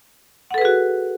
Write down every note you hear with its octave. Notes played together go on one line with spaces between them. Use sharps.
F#4 G#4 A4 B4 F#5